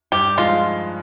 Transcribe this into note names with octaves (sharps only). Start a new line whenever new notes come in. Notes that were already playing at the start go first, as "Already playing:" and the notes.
G2 G4
F3 G#3 D#4 F4